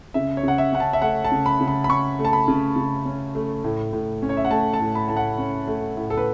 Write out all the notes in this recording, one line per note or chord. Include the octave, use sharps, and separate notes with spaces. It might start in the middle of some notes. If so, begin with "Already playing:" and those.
C#3 E5
C#5
C#3 F#5
E5
C#4 F#5
A5
E5
A3 F#5
A5
C#3
B5
C#3
B5
B5
C#4 C#6
A3
A5
B5
C#3
C#3
C#4
A3
A2
A2
C#4
C#5
E5
F#5
A3 A5
A5
A2
B5
A2 A5
F#5
C#4
A3
A2
A4
B4